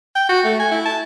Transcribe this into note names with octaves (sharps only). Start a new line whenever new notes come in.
G5
F#4
A3
G#5
E4
A5